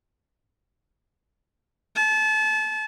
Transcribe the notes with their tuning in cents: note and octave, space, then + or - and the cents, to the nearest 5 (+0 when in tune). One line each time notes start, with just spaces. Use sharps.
A5 -30